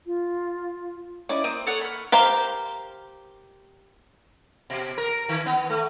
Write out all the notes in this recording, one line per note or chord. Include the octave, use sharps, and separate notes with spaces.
F4
C#4 E4 D5 D#5
A#3 C4 D#6
A4 C#5 F#5
B5 F6
G4 A#4 C5 F5
B2
A#4
D#3
B3
A3